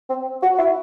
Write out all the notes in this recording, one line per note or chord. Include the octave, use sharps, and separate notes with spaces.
C4
F#4
E4